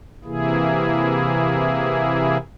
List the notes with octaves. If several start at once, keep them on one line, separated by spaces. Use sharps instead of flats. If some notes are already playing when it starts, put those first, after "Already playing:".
C3 E3 A#3 E4 G#4